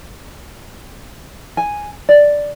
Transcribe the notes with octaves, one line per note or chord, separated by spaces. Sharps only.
G#5
D5